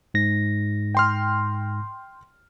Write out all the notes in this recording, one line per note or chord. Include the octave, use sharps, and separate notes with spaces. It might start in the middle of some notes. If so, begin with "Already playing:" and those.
G#2 A#6
G5 C6 F6